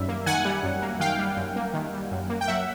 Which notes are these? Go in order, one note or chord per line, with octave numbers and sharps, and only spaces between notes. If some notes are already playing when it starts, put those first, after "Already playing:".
Already playing: F#2 D#3 G3 E5
A#3
D#3 F#5 G#5
G3
F#2
A#3
D#3 F5 G5
G3
F#2
A#3
D#3
G3
F#2
A#3
G5
F#3 E5 F#5